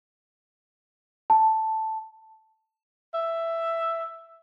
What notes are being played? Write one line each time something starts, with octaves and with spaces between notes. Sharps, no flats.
A5
E5